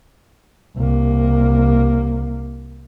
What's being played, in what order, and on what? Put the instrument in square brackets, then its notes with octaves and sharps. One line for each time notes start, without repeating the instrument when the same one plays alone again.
[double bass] C2 A#3